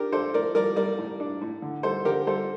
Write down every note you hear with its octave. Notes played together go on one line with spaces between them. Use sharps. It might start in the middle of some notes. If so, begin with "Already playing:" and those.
Already playing: D4 G4 A#4
D4 A4 C5
A2 A#4 D5
G3 A#4 D5
G3 A#4 D5
A2
D4
A2
D3
G3 A4 C5
D3 G4 A#4
G3 A4 C5